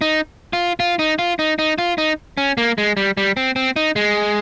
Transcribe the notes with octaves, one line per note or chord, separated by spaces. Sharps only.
D#4
F4
F4
D#4
F4
D#4
D#4
F4
D#4
C#4
A#3
G#3
G3
G3
C4
C4
D#4
G#3